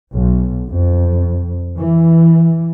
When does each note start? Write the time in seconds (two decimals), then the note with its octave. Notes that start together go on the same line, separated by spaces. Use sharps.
0.12 B1
0.69 F2
1.77 E3